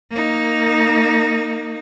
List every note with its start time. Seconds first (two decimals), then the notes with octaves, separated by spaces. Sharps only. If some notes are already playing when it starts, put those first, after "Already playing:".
0.11 A#3 D#4